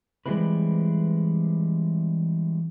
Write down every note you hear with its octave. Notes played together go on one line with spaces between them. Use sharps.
E3 G3 G#3 C4 E4 B4